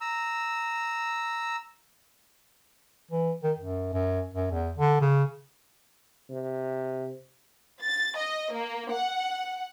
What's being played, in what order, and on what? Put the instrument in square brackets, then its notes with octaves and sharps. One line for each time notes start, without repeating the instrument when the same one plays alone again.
[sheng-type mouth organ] A#5 E6
[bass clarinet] E3
D#3
F#2
F#2
F#2
E2
D3
C#3
[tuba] C3
[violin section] A6
D#5
A#3
F#5